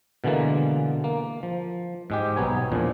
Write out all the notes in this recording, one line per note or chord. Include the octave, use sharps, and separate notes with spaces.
B2 D3 E3 G#3 A#3
A#3
F3
G#2 G#3 G4
B1 B3 D#4 C#5 G#5
E2 A#2 F3 D4